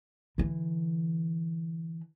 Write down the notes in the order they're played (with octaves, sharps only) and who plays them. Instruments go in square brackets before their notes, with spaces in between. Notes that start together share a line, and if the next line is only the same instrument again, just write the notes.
[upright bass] D3 E3